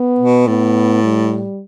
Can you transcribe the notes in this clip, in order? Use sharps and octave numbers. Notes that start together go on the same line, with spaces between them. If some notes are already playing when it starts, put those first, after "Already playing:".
Already playing: B3
B2
A2 B3
G3